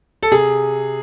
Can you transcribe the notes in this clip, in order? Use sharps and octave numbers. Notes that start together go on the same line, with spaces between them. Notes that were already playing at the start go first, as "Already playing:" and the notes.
A4
C3 G#4